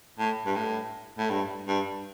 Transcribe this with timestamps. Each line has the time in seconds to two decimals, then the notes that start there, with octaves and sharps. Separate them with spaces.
0.19 A2
0.46 G2
0.56 A2
1.18 A2
1.30 G2
1.68 G2